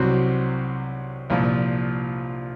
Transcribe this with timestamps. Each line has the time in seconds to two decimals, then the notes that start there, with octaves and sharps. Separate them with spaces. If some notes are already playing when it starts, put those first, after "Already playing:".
Already playing: C2 C3 F#3 C4 F#4
1.30 C2 A#2 F3